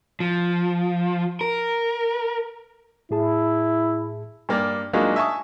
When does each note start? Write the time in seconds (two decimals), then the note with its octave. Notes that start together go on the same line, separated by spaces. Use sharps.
0.20 F3
1.41 A#4
3.11 A2 E4 G#4 A5
4.49 G2 A#3 A#4 D5
4.93 F#3 G#3 A#3 D4 D#4 F4
5.16 E5 G#5 A5 C#6 D#6